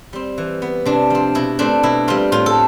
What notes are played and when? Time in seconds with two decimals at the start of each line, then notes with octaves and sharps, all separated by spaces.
0.13 G3 C4
0.38 E3
0.62 B3
0.86 C3 D4
1.10 F3 C4
1.35 B2 E4
1.59 A3 C4 D4
1.83 B2 E4
2.08 G3 C4 F4
2.32 A2 F4
2.46 A4